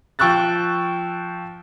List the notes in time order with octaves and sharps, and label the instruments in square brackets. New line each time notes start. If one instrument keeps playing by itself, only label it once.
[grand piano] F3 G5 C#6 E6 F#6 A6